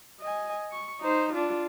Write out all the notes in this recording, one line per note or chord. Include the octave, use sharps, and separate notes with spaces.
D#5 G#5
C#6
D#4 C5
D4 F4